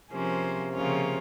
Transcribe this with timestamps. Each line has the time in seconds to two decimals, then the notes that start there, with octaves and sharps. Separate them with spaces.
0.12 C3 F3 A#3 C#4 G#4 C5
0.72 C#3 F3 A#3 C#4 F4